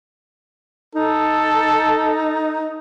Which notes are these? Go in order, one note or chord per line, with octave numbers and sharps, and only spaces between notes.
D#4 A4